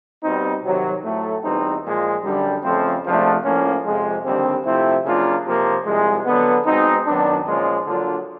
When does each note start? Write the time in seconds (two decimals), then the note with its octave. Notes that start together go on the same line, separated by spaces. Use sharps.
0.24 B2 G3 C4 D#4
0.63 C3 D#3 F#3
1.04 A2 F#3 A3
1.44 E2 B2 G3 C4 D#4
1.84 A#2 F3 G#3
2.24 F#2 D3 G3
2.64 F2 C#3 F3 A3 C4
3.05 C#2 C3 F3 A3 D4
3.45 A2 F3 A#3 C#4
3.85 F2 C3 F3 G#3
4.25 D#2 D3 G3 C4
4.65 C3 F3 A3 C4 E4
5.05 C#3 F#3 A#3 D4 F4
5.45 C3 F3 A#3
5.86 C2 C3 F3 G#3
6.26 D3 F#3 B3
6.66 B2 G#3 C4 D#4
7.06 F#2 D#3 F#3 B3 D4
7.47 A#2 F3 G#3 C#4 F4
7.87 D3 F#3 A#3 D4 F4